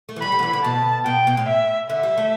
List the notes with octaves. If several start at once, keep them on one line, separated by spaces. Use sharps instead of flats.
A3
E3
G3 B5
G3
D3
E3
D3
B2 A5
B2 G5
B2
A2
E5
D3 E5
G3
A3